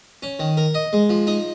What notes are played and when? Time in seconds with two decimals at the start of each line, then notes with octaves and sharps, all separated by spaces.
0.23 C#4
0.39 D#3
0.57 A#4
0.74 D#5
0.93 G#3
1.09 F3
1.27 D#4